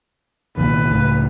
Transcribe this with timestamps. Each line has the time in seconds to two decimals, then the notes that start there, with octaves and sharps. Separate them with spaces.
0.57 C2 A#2 D#3 B4
0.91 C#2 A2